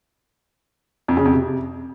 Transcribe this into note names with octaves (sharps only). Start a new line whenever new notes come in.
F2
C#3
F2
C3